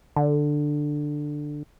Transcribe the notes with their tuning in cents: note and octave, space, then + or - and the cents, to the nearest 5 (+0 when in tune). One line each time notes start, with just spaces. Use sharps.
D3 +10